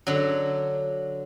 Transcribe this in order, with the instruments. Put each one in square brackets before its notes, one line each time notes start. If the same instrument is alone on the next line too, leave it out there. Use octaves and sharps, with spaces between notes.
[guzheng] D3 F#3